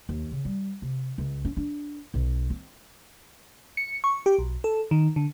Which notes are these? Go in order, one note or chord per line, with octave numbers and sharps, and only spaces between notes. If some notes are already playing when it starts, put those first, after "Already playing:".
D#2
C#3
G3
C3
C#2
C#4
D4
B1
C4
C#7
C#6
G4
B1
A4
D#3
D3